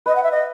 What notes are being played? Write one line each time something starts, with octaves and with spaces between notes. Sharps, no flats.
B4 D#5
F#5
E5
D#5